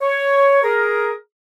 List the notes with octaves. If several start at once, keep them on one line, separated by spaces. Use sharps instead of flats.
C#5
G#4 A#4